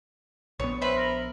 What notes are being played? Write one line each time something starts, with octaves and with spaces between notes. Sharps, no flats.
A#1 B3 C#5
B4 C5 E5
A#4